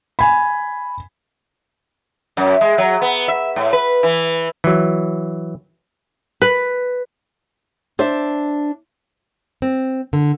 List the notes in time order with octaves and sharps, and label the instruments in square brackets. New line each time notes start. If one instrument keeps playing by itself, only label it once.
[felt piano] G#5 B5
[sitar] F#2
G#3
F#3
B3
E5
A2
B4
E3
[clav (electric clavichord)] E3 F#3
[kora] B4
[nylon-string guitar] D4 C5 E5
C4
D3